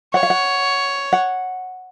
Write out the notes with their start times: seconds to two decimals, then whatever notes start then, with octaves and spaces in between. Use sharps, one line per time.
0.14 C#5 F#5
0.23 F5
0.30 F#5
1.13 F#5